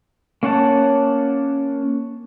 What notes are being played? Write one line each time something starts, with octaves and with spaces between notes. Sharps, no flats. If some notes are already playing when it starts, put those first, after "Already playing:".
A#3 C#4 C#5 F#5 A5